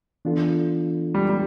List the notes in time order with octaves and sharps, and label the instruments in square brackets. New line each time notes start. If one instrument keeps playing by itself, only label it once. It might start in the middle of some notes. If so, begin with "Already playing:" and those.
[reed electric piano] E3 B3 D4 F4 A4
[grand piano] G3
G3